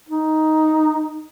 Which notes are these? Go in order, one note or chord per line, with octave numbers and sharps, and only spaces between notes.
D#4